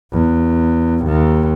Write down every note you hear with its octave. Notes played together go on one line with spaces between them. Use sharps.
E2
D#2